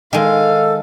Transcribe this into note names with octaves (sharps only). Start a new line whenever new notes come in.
D#3 G#3 A4 F5